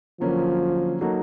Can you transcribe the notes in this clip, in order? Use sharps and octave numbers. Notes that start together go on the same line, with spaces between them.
D3 F3 F#3 A#3 C#4
F#3 A#3 D#4 F#4 A4